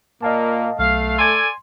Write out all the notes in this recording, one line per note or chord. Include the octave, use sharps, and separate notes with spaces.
A#2 A#3 D#5 F5 A5
B1 A3 F5
A4 D5 G#5 C6